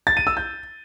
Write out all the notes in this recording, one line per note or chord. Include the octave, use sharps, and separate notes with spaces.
A6
D#7
E6
G6